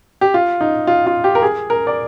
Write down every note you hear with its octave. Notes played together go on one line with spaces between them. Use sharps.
G4
F4
D#4
F4
F4
G4
A#4
G#4
A#4
D5